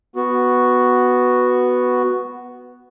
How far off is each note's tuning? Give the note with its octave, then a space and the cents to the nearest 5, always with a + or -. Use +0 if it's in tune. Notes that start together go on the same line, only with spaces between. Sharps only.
B3 +0 F#4 +0